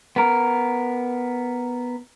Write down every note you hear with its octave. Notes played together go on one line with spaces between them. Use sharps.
B3 A#4